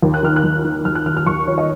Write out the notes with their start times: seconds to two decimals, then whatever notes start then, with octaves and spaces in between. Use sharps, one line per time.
0.02 D#2
0.14 F#6
0.23 D#3 F6
0.36 F#6
0.44 D#2
0.64 D#3
0.85 D#2 F6
0.95 F#6
1.06 D#3 F6
1.17 F6
1.26 D#2 C#6
1.47 D#3 C#5
1.58 D#5